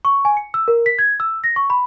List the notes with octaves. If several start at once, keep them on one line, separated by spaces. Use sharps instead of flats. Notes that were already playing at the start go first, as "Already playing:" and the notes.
C#6
G#5
C#7
E6
A#4
B6
G#6
E6
A#6
C#6
B5